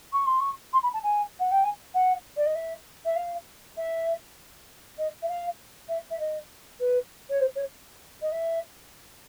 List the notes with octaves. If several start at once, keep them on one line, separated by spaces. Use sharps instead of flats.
C#6
C6
C#6
C6
B5
A5
G#5
F#5
G5
G#5
F#5
D5
D#5
E5
E5
F5
E5
D#5
E5
F5
E5
E5
D#5
B4
C#5
C5
C#5
D#5
E5